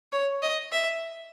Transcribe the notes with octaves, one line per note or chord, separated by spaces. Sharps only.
C#5
D#5
E5